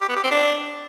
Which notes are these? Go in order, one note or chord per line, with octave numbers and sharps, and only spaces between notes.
G4
B3
G4
C4
D4